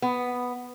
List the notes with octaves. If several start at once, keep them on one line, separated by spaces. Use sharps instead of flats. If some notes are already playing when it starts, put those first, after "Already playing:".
B3